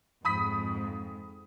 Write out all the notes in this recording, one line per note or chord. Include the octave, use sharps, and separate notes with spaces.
F2 G#2 B5 D#6 B6